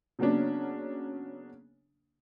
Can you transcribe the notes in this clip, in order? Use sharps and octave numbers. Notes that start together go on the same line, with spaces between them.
C#3 F#3 A#3 B3 C#4 D4